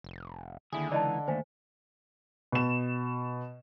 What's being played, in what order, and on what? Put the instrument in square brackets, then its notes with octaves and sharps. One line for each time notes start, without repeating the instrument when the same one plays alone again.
[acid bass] F1
[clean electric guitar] D#2 E4 G#4 [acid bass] D3
[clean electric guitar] C#2 E3 D#4 [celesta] D5 D#5 A5
[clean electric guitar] D#2 A3 [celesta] C5 G#5
[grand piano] B2 E7